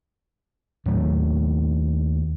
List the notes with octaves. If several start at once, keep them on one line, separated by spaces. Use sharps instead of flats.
D#2 A2 F#3 A3